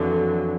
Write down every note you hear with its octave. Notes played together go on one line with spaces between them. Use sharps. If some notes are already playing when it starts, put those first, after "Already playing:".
Already playing: F2 D3 E3 F#3